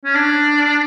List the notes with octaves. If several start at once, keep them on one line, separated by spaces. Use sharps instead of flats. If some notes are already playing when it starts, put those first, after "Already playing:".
C#4
D4